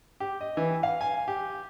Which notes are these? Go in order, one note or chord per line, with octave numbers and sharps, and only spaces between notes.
G4
D#5
E3
F5
G#5
G4